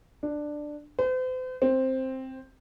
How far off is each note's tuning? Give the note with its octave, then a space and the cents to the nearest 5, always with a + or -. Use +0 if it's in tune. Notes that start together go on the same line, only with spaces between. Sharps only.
D4 +10
C5 -40
C4 +5